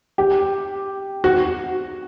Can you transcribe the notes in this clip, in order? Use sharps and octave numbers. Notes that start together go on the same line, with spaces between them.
G4
F#4